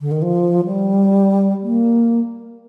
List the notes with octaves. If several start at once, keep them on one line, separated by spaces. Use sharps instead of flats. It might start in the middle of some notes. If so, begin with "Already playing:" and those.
D3
D#3
F3
G3
A#3